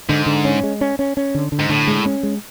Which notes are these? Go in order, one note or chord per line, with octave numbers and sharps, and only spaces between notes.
G#2 D3
D3
C#4
G#3
C#4
C#4
C#4
D3
D3
G#2
A2 D3
G#3
C#4
G#3